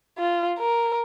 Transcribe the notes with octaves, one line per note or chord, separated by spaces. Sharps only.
F4
A#4